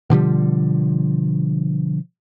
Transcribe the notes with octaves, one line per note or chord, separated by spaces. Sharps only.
B2 D3 F3 G3